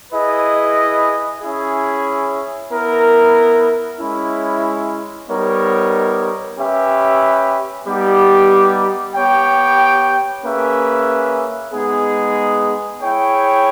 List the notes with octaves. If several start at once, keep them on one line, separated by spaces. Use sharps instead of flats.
E4 G#4 B4 D#5
C#4 E4 G#4
B3 E4 A#4
G#3 C#4 E4
G3 B3 D#4 A#4 C#5
C#4 G4 B4 E5
G3 B3 D#4 G4
B3 G4 C#5 G5
A#3 C#4 G#4 B4 E5
G#3 B3 D#4 G#4
E4 G#4 C#5 G5